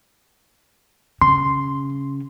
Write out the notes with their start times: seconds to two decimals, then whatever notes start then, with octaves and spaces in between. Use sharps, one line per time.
1.22 C#3 C6